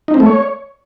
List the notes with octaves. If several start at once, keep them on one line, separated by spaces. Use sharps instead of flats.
D#4
C4
A3
C#5